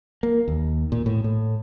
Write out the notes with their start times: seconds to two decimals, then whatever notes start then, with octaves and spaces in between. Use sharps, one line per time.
0.23 A#3
0.48 D#2
0.92 A#2
1.06 A2
1.24 A2